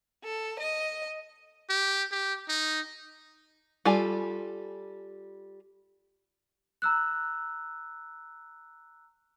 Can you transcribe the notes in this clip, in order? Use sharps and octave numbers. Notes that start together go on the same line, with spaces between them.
A4
D#5
G4
G4
D#4
G3 F4 A4 G#5
A#5 E6 F#6